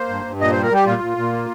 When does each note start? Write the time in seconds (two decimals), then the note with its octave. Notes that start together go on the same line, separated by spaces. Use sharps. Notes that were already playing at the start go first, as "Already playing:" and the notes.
Already playing: A#3 C5
0.09 G2
0.25 G2
0.40 A#2 D#5
0.51 G3 C5
0.63 A#4
0.71 G3 G4
0.86 A#2 F4
1.01 A#2
1.17 A#2
1.32 A#3